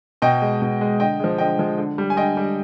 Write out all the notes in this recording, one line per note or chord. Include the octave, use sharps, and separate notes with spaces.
B2 D#5 G5
G#3
B2
G#3
D3 D#5 G5
F3 G#3
D3 D#5 G5
F3 G#3
D3
G3
G#5
D3 D#5 G5
G3